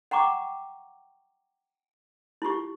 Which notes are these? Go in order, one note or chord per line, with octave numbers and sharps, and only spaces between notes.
F#5 G5 A#5 C#6 D6
E4 F4 G4 C#6